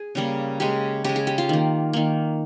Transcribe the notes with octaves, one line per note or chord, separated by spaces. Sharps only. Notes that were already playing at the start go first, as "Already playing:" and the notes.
Already playing: G#4
C#3 G3 A#3
C#3 G#3 G4
C#3 G#3 G4
G#4
G4
F4
D#3 A#3
D#3 A#3